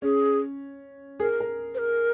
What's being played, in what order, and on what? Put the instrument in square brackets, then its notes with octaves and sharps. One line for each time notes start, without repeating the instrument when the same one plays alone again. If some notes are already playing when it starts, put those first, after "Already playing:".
[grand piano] C#4 [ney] G#4
[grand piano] G#4 [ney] A#4
[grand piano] A#4
[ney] C5
A#4